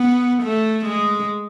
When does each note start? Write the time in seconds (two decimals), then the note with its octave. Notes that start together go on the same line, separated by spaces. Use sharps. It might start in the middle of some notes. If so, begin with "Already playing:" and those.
Already playing: B3
0.43 A3
0.85 G#3